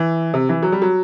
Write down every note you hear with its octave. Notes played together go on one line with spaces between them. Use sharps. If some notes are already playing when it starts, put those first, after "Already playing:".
Already playing: E3
C3
E3
F#3
G3
F#3